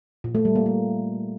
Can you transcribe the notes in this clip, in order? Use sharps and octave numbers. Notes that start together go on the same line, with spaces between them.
A#2
A3
G3
A#3
A3